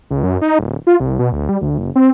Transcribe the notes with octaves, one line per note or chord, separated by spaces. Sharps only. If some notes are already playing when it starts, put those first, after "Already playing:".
C#2
F#2
D#4
D1
F4
C2
B2
D2
G3
D2
F#1
C4